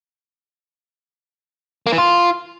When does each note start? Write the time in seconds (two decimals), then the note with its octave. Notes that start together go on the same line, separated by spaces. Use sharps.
1.87 A#3
1.92 E3
1.98 F4